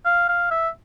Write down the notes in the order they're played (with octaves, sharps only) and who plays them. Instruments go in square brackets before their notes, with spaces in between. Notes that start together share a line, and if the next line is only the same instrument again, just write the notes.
[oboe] F5
F5
E5